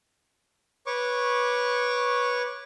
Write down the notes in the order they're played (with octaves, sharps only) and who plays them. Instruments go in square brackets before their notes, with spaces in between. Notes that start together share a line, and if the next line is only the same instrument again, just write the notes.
[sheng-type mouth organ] B4 C#5 C#6 D6